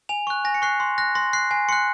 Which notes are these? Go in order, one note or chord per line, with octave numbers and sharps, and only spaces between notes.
G#5 F7
C#6 F#6
G#5 A#6
C#7
C#6 F#6 C7
C6
F#6 A#6
C6 A#6
F#6 C7
G#5 C7
C6 F#6 C#7